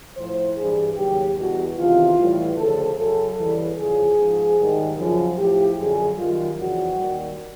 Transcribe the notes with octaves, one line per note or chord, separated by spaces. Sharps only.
A2 F3 C5
G2 E3 G3 G#4
D#2 C#3 F#3 G4
E2 B2 G3 F#4
E2 C3 D#3 F4
A2 E3 G3
D2 C#3 F3 A4
F#2 C#3 F#3 A4
E2 C#3 E3 G3
E2 C#3 F3 G#4
G#2 F3
G#2 D#3 G3
F#2 C#3 F3
A2 F3 G4
F#2 D3 F3 G#4
F#2 D#3 G3 F4
F2 C#3 E3 G3 F#4
D#2 D#3 G3